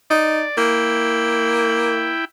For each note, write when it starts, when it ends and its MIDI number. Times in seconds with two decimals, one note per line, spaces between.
0.10 0.43 63
0.10 0.57 74
0.57 2.15 58
0.57 2.25 64
0.57 2.25 79